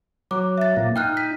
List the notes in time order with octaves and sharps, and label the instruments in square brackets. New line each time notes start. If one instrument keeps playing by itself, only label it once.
[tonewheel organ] F#3 [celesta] D6
[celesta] E5 A6
[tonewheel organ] A#2 A#3
[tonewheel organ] D#4 [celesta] G5 F6 F#6
[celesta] B6